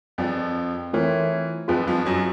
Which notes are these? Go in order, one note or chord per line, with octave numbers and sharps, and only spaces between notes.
F2 F3 G#4 B4 D5 G5
E3 A3 C4 F4 A#4 C#5
F2 F3 F4 G#4 B4
F2 F3
F#2 F#3